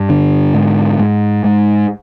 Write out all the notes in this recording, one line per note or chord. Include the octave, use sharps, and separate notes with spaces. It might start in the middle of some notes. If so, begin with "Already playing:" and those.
Already playing: G2
D3
G#2
G#2
G#2